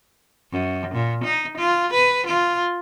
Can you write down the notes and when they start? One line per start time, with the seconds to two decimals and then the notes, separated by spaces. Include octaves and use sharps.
0.51 F#2
0.94 A#2
1.24 D#4
1.57 F4
1.93 B4
2.27 F4